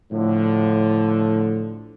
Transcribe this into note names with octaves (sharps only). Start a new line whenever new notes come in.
A2 D3 F3